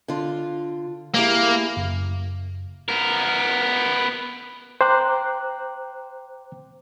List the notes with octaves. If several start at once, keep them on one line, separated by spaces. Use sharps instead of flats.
D3 F4
A#3 E4 G4 G#4
F#1
B3 A#4
C5 G5 A#5 D6 F#6